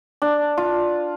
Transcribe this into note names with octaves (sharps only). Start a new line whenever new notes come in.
D4
F4